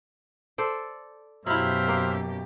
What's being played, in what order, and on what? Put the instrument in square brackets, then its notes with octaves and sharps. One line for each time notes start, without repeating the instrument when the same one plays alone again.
[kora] A4 C5 D5
[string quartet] F#2 B2 G4 [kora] F#3 E4 [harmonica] C5 E5 F5
[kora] A#3